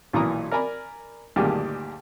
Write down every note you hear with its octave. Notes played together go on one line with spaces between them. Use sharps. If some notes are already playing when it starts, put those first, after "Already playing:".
B1 A#2 E3 A#5 D#6
A#4 D5 G#5 A#5 B5
D2 G2 A#2 D#3 G4 G#4